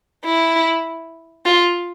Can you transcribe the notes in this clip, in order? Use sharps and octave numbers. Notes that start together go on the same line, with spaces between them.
E4
F4